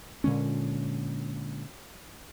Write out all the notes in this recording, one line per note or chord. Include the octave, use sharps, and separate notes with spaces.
A#2 D3 G#3 C#4